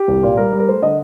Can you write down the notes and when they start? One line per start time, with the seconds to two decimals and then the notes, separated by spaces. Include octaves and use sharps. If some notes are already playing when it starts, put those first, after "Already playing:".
Already playing: G4
0.08 C2
0.23 A#2
0.37 G3 A#4
0.52 G3
0.59 A#4
0.68 A3 C5
0.82 D3 D#5